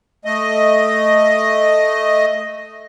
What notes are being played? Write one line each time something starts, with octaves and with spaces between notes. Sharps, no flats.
A3 D#5